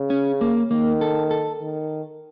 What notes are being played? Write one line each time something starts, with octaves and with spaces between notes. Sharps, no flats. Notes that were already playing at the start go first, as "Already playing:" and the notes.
Already playing: C#3
C#4
A#3
D#3 A#3
A4
A4
D#3